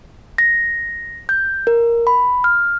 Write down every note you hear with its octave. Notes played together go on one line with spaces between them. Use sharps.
A#6
G6
A#4
B5
F6